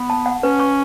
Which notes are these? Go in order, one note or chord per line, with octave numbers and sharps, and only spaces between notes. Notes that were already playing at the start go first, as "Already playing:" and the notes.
Already playing: B3
A5
F#5
C#4 B4
C#6